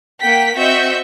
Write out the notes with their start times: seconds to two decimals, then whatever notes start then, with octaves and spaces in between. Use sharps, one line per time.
0.21 A#3 F#5 G5 B6
0.55 C4 F#4 D#5 E5 C#6 G6